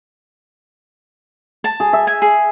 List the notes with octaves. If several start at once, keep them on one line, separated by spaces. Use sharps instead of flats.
A5
G#4
E5
G#5
G#4